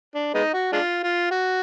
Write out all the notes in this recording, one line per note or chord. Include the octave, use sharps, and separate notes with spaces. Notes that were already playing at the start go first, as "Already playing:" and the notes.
D4
G#3 B3 D#4
F#4
G#3 D4 F4
F4
F#4